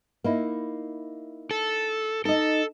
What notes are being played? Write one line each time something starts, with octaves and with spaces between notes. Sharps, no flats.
A#3 D#4 E4
A4
D#4 A4 D#5